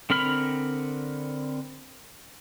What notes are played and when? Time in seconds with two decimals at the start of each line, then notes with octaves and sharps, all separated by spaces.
0.10 D3 C4 A#4 B5 F6